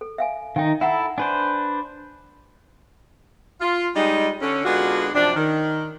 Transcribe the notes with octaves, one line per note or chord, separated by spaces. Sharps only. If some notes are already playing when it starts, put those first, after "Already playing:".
A4
E5 F5 G#5
D#3 D#4 F5 G5
E4 A4 E5 F#5 A#5
D4 B4 C5 G#5
F4
G3 G#3 D#4
D3 C#4
D3 G#3 B3 D4 F4 F#4
F#2 C3 F3 D4
D#3